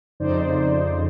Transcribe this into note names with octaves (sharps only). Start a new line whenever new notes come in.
F2 C#3 D#4 C5 D5